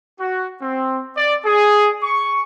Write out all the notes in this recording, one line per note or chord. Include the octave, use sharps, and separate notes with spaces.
F#4
C4
D5
G#4
C#6